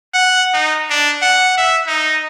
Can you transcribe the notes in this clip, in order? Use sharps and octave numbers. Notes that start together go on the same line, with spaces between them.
F#5
D#4
D4
F#5
E5
D#4